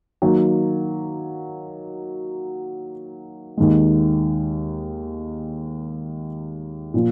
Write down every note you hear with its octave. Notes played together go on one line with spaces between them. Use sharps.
D#3 F#3 A#3
D#2 D#3 G#3
A#2 F3